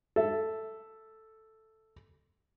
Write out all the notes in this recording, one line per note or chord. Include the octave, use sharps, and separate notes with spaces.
A4 E5